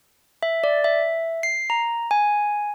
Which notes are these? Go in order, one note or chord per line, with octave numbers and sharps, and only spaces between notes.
E5
D5
E5
C7
A#5
G#5